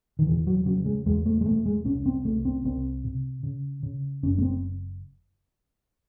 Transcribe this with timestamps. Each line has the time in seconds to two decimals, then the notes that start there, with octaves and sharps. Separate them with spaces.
0.19 D#3
0.27 E1 E3
0.47 F#3
0.66 C#3 F#3
0.86 G#3
1.06 E2 G#3
1.26 A3
1.41 G#3
1.46 E1 A3
1.66 G#3
1.85 C2 C#4
2.06 C4
2.25 C2 A3
2.45 C4
2.65 C2 C4
3.04 C3
3.43 C#3
3.83 C#3
4.23 F#1 C#4
4.38 A3
4.42 C4